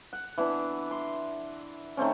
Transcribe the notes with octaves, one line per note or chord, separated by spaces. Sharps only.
F#5
E3 B3 D4
C6
D#3 A3 C4 C#4